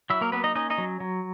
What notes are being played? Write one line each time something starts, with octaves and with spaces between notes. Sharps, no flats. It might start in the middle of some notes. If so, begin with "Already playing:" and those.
F#3 E4 E5
A#3 A#4
A#3 B3 B4
D#4 D#5
C#4 D#4 D#5
D#4 D#5
F#3
F#3